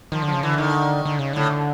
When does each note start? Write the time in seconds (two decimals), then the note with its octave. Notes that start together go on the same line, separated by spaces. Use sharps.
0.12 D#3 F3
0.22 D3
0.28 C#3 F3
0.43 D3 E3
0.58 D#3
1.05 D3
1.19 C#3
1.33 A2 D3